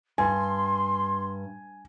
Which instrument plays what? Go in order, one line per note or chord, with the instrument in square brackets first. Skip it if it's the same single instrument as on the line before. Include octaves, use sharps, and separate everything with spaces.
[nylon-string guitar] G2 [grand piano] G#5 [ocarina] C6